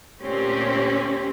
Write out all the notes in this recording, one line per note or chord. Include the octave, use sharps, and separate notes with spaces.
D2 A#2 C4 C#4 G4